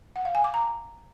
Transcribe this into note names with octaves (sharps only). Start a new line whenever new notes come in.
F#5
F5
G#5
D6
A#5